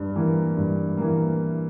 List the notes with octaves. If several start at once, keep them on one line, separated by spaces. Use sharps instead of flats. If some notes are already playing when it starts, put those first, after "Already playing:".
Already playing: G2
E3 A#3
G2
E3 A#3